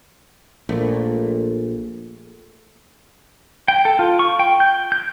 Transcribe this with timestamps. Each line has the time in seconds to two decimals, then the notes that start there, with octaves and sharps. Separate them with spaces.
0.69 A#1 A#2 A3
3.68 G5
3.85 A4
3.99 F4
4.19 C#6
4.39 G5
4.60 G6
4.92 G6